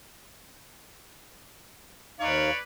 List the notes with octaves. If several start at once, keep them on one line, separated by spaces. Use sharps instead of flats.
D#2 D#4 B4 C#5 D5 F5